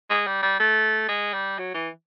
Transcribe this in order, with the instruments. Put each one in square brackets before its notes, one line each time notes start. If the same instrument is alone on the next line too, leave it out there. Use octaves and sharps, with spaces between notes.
[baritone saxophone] G#3
G3
G3
A3
G#3
G3
F#3
E3